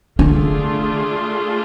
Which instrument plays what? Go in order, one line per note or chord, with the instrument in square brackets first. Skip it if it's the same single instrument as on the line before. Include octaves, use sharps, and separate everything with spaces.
[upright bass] D3 [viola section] A3 D4 F4 G#4